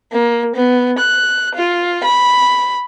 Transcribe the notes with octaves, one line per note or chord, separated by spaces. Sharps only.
A#3
B3
F#6
F4
B5